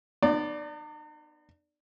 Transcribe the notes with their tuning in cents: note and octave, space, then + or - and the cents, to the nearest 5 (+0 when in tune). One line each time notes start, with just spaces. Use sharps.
B3 +0 D#4 -45 D5 +0